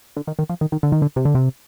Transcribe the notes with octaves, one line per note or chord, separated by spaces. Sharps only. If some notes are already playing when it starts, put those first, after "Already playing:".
D3
D#3
D#3
F3
D#3
D#3
D3
D#3
D3
C3
D3
C3